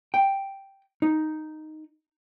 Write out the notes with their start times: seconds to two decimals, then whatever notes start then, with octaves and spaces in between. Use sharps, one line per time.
0.14 G5
1.02 D#4